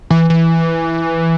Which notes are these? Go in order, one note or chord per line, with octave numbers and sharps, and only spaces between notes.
E3
E3